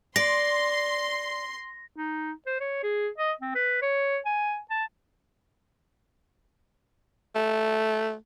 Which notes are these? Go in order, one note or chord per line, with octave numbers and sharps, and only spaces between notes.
D5 C6 A#6
D#4
C5
C#5
G#4
D#5
C4
B4
C#5
G#5
A5
A3